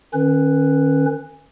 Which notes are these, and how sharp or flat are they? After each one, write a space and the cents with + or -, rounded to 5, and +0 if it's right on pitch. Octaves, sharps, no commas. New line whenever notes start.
D#3 -35 C#4 -20 B4 +0